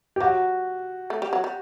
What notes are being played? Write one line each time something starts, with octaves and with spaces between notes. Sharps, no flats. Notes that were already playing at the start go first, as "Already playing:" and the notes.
G4
F#3 F#4
A3
G3
F#3
G3